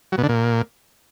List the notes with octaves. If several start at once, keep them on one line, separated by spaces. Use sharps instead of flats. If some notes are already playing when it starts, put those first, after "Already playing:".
F#3
B2
D3
A#2